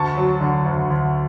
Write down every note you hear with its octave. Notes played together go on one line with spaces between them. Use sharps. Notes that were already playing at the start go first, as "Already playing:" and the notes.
Already playing: D2 A5 C#6
F#3
D3
D2
D2